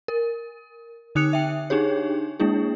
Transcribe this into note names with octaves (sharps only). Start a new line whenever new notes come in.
A#4
D3 D#4 D#6 F#6 C#7 F7
E5 G5
D4 D#4 G4 G#4 C#5
G#3 A#3 D4 E4 G#4